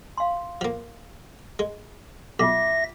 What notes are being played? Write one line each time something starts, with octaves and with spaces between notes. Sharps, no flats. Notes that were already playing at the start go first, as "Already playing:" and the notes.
F5 C6
F3 A#3
G#3
B1 F4 E5 F#5 D6 A#6